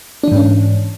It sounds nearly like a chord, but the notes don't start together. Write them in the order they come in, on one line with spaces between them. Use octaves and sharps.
D4 E3 G#2 C#4